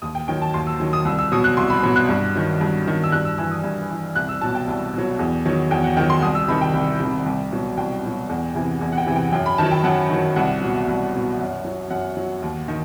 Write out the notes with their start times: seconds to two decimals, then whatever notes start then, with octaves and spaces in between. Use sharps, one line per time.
0.02 D#2 D#6
0.15 G5
0.28 D#3 F#3 G5
0.42 A5
0.54 D#2 C6
0.67 E6
0.80 D#3 F#3
0.93 D#6
1.05 C2 E6
1.19 E6
1.32 B2 F#3 D#6
1.44 F#6
1.57 C2 C6
1.70 B5
1.83 B2 F#3 B5
1.96 F#6
2.09 G2
2.36 D#3 F#3
2.61 G2
2.86 D#3 F#3
3.04 E6
3.12 G2 F#6
3.25 E6
3.38 E3 E6
3.51 D#6
3.64 G2
3.90 E3
4.16 C2 F#6
4.29 E6
4.41 B2 F#3 A5
4.55 G5
4.68 C2
4.93 B2 F#3
5.19 E2
5.45 D#3 F#3
5.71 E2 G5
5.84 F#5
5.97 D#3 F#3 G5
6.10 C6
6.22 C2 D#6
6.35 E6
6.48 C3 D#3 B5
6.61 G5
6.74 C2
6.99 C3 D#3
7.26 C2
7.52 B2 F#3
7.77 C2 G5
8.03 B2 F#3
8.29 E2
8.55 C3 E3
8.81 E2
8.92 F#5
8.97 G5
9.07 C3 E3
9.16 G5
9.32 F#2 G5
9.46 B5
9.58 D#3 F#3 A5
9.71 G5
9.84 F#2 F#5
10.10 D#3 F#3
10.36 C2 F#5
10.61 B2 F#3
10.88 C2
11.13 B2 F#3
11.39 F#2
11.65 F#3
11.90 F#2 F#5
12.17 F#3
12.42 D#2
12.68 D#3